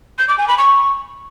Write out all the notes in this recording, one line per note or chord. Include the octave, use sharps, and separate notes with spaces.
G6
D6
G#5
B5
C#6